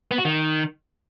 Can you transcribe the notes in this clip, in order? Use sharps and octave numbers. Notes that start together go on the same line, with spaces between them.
B3
F#4
D#3